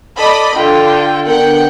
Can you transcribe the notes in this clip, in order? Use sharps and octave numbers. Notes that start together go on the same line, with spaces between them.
A4 D5 D#5 B5
D3 F4 G5
D3 B3 A#4 F#5 G5